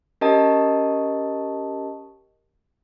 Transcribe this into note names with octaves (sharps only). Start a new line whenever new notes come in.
C#4 G4 A#4 D#5 A5